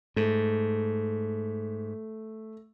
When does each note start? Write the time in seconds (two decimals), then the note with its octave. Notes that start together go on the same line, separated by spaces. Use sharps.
0.16 G#2 A3